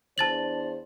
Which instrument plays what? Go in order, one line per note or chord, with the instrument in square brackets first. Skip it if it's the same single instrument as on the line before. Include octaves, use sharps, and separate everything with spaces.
[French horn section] E2 D4 C5 [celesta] A5 A6 F#7